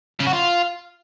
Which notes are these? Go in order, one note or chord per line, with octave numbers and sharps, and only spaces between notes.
C#3
F#4
F4